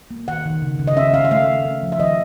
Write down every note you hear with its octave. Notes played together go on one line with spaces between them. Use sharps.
A#3
D#3 F#5
D#3
C#3
C#3
D#5
C#4 E5
C#4 F5
E5
A3 F5
A3
C#4
F3
E5
D#3 D#5